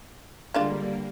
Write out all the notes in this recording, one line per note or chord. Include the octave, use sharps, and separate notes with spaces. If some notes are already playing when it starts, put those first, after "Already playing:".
D3 G3 G#3 A#3 D4 F4